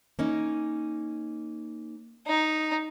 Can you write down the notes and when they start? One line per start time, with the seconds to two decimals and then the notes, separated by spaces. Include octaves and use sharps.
0.19 A#3 C#4 D#4
2.26 D#4